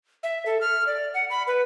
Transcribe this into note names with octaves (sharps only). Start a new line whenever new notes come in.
E5
A4
F6
D5
F#5
B5
B4